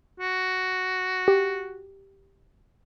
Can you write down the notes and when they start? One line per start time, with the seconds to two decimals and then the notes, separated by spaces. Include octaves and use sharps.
0.20 F#4
1.28 G4